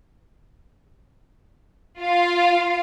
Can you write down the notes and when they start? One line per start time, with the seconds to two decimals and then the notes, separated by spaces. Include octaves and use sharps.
2.00 F4 F5